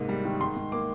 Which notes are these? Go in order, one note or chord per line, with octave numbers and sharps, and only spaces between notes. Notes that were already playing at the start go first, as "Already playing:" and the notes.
Already playing: G#2 C3 A#3
G3
D#3
G#2 C6
G#2
A#3 D6